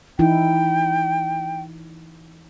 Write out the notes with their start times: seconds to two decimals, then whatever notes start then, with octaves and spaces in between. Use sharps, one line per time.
0.19 E3 D#4 E4 G5